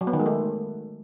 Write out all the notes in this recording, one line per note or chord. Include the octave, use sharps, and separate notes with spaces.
F#3
B3
D#3
G#3
A3